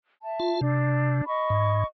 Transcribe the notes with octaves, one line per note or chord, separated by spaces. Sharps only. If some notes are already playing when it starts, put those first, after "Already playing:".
E5 A5
F4
C3 D4
D#5 B5 C#6
G#2